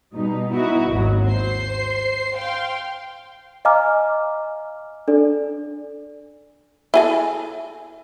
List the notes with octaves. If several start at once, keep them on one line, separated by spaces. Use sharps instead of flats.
B2 G3 D#4
B3 D#4 E4 F#4
G#1 D#2 F#3
C5 C7
F5 G5 C6
D#5 F5 G#5 A#5 D6 F6
D4 A4 D5
E4 G#4 A4